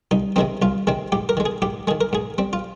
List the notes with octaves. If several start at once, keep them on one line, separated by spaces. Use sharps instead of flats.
C2 D#4
C3 D#3 G#3 C4 D#4
C2 F4
C3 D#3 G#3 C4
G#2 G4
A#4
D#3 G#3
G#4
G#2 G4
D#3 G#3 G#4
A#4
G#2 G#4
G3 C4
F4